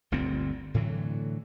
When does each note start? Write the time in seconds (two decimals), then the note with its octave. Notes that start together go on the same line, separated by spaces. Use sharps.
0.12 G1 D2 A#2 C4
0.74 A2 D3 E3 F#3